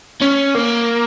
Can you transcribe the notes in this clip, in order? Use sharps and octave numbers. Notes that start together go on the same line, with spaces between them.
C#4
A#3